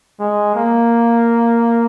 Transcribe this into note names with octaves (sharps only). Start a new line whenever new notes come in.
G#3
A#3